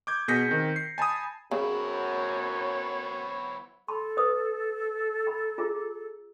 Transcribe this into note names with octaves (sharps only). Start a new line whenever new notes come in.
D6 G6 G#6
B2 G#4 G6 A#6 B6 C#7
D#3 C4
C7
G#5 A5 B5 D#6
F#2 C#3 F#3 B3 C4 E4 C#5
A4 A5 B5 C6
B4 D#6
A#5 B5
F4 G#4 A#5